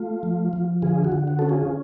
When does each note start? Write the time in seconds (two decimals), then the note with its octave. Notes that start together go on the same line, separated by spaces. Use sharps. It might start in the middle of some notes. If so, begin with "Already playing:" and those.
Already playing: A3 F4
0.23 F3
0.53 F3
0.82 D3 F4 G#4
1.04 F#4
1.12 D3
1.28 F#4
1.39 C#4 A4
1.49 F4 G#4